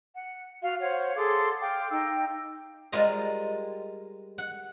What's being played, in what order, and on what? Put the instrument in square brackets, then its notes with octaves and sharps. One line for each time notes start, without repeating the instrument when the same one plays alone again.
[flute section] F#5
F#4 F5
C5 C#5 F5 F#5
G#4 A4 C6 D6
F5 G5 D6
D#4 G5 E6
[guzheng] G3 G#3 F4 A#4 C5 D#5
F#5